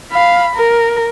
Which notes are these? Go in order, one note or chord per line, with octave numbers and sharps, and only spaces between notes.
F5 B5
A#4